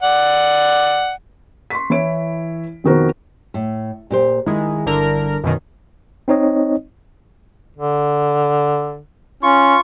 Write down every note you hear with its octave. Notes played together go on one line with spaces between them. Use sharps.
D5 F#5
C6 C#6 B6
E3 E4 C#5 D7
F2 B2 D#3 F#4 A#4 C5
A2
A#2 G4 C5
D#3 G#3 E4
G1 D3 A#4
F#2 B2 D#3
C4 D#4 C#5 D#5
D3
C#4 F4 C#6